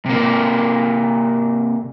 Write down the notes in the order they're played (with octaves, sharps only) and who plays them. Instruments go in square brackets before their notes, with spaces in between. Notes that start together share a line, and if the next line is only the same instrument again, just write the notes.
[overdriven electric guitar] C3 A#3